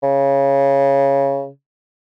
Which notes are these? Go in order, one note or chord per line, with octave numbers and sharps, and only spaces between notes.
C#3